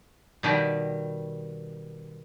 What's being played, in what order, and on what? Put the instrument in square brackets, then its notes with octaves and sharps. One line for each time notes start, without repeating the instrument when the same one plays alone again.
[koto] B2 D#3 G3